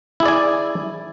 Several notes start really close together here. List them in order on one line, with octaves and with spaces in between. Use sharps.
E4 G#4 D5 G#5